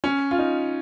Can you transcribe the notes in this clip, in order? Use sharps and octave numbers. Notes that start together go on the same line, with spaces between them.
C#4
F4
D#4